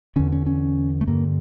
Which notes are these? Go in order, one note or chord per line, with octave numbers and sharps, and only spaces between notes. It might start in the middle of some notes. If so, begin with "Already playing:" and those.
E2 D3 C#4
C#4
C#4
A3
G2 D3 A#3